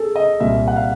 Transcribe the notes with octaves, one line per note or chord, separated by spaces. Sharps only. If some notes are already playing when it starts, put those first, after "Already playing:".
Already playing: G#4 A4
D#5
C2 A#2 G3 A#3 E5
F#5
F5